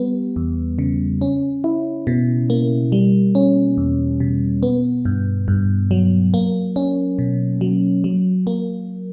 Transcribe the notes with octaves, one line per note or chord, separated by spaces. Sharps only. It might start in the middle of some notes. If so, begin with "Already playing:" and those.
Already playing: G3 B3
E2
C#3
C#4
E4
B2
A#3
G3
C#4
E2
B2
B3
G2
G2
F#3
A#3
C#4
B2
F#3
F#3
A#3